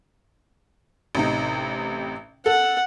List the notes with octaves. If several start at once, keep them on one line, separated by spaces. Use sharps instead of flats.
A1 C3 D#4
A4 F#5